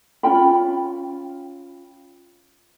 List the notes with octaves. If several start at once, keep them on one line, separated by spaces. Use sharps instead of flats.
C#4 F4 G5 B5